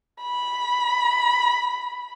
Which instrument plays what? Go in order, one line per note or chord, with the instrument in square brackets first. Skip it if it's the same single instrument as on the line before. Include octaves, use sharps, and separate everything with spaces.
[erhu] B5